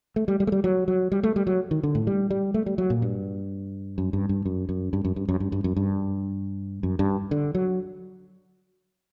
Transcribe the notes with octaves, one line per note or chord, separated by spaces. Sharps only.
A3
G3
G3
A3
G3
F#3
F#3
G3
A3
G3
F#3
D#3
D3
A2
G3
G3
A3
G3
F#3
A#2
G2
F#2
G2
G2
F#2
F#2
G2
F#2
G2
F#2
G2
G2
F#2
G2
F#2
G2
D3
F#3